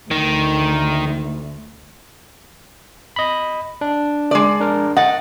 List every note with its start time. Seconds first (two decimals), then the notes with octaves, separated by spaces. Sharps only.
0.11 D2 D#3
3.16 D#5 B5
3.81 D4
4.31 G#3 D5
4.60 D4 A#4
4.97 D#5 F#5 A6